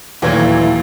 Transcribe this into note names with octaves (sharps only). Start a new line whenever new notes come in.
D#2 A#2 E3 F#3 A3 G#6